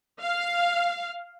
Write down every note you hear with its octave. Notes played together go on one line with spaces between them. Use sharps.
F5